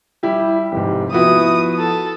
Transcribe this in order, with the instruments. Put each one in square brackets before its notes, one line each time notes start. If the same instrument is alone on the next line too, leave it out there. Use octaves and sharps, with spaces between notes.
[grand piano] G3 E4 G4
[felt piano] F1 [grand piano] G#2 G4
[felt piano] F3 E4 [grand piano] B3 F#4 [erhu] D#6
[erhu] A4